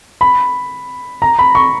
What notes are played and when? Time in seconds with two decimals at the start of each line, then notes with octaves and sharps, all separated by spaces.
0.21 B5
1.22 A#5
1.39 B5
1.55 C#6